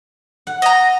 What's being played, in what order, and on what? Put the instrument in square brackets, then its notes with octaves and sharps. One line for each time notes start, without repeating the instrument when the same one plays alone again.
[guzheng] F#5
[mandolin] D#5 A#5